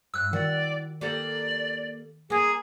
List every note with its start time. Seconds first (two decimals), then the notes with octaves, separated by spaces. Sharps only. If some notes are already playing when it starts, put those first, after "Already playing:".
0.14 G2 E6 F#6
0.33 D#3 E4 F#4 D5
1.01 A#3 G4 A4 D5
2.30 A#3 G#4 A#4